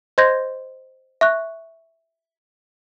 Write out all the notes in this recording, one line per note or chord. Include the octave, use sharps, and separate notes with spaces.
C5 D#5 C6 G6 G#6 A#6
E5 C#6 F#6